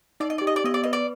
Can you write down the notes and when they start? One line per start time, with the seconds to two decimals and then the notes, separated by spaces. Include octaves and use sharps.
0.20 D#4 D5
0.30 D#5
0.38 G4 D5
0.47 D#5
0.56 D5
0.64 B3 D#5
0.74 D5
0.84 B4 D#5
0.93 D5